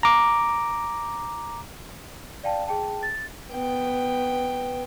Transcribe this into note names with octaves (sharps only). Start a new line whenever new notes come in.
A#5 D6
D5 F5 G5 A5
G#4 G5 A5
A6
B3 G5